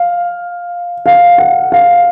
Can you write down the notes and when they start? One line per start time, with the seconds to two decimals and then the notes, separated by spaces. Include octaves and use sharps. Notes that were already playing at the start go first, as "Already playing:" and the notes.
Already playing: F5
1.06 F5
1.38 F#5
1.72 F5